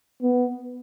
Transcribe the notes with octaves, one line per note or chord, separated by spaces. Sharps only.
B3